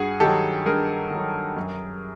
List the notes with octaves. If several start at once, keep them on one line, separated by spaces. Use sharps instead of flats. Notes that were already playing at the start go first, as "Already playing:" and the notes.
Already playing: G2 F#4 G#4
D#3 F#3 G4 A4
G2 G#4 A#4
D#3 F#3
F#2